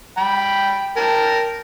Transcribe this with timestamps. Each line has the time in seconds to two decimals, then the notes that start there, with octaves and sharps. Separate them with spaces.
0.18 G5 B5
0.97 A#4 G5 A5